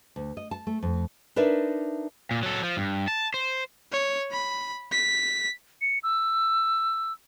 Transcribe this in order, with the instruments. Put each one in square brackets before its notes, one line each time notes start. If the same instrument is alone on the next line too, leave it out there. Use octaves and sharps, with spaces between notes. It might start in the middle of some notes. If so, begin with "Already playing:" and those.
[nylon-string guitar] D2
D#5
A5
A3
F2
D4 D#4 A#4 B4 D5 E5
[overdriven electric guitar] A#2
F#3 A4
F3
G2
A5
C5
[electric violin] C#5
B5
B6
[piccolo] C#7
E6